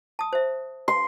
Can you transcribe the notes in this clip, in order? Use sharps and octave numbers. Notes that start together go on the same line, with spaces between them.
A5 D#6
C5 E5
C6